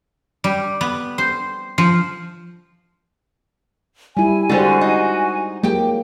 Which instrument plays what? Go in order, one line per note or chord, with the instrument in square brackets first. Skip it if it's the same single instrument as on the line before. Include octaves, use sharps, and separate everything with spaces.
[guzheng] G3
B3
C5
F3
[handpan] G3 E4 [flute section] G#5
[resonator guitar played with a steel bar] D3 G3 [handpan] G#3 C5 [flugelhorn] F#4
[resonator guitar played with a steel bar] D#4
[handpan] F#3 G#3 A#3 [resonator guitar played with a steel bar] G4 G5